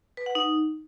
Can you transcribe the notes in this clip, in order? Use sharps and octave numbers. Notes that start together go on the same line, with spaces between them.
B4
F#5
D#4